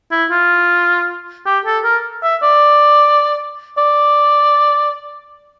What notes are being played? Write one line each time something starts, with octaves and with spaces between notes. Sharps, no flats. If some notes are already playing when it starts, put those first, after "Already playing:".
E4
F4
G4
A4
A#4
E5
D5
D5